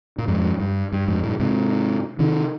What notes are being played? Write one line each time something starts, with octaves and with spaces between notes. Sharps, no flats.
A#2
F2 G#2
G2
G2
F2 G#2
G2 A#2
G#2 C3
C3 D#3